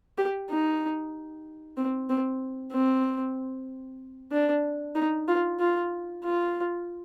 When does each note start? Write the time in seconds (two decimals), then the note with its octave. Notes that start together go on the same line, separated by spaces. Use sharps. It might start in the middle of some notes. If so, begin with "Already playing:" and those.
0.18 G4
0.50 D#4
1.77 C4
2.09 C4
2.72 C4
4.32 D4
4.95 D#4
5.28 F4
5.60 F4
6.24 F4